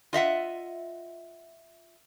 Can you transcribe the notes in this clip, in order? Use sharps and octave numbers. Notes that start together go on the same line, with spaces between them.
F4 D#5 E5 F#5